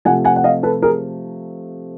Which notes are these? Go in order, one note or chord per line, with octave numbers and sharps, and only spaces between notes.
C3 F3 A3 C4 F#5 G#5
F#5 G#5
F#5
D#5 F5
A4 B4
G#4 A#4